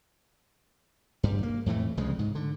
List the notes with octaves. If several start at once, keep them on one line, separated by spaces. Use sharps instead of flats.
G2 G3
A#3
F2 A2 E3 A3
C2 C#3 F3 G#3
G#2
D3